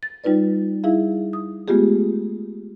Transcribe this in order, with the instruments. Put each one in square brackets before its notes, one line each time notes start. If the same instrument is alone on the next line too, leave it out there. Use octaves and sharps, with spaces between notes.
[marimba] A6
G3 D#4 F4 B4 D5
G3 D#4 E4 G#4 E5 F5
D#6
G#3 A3 B3 F4 G4 G#4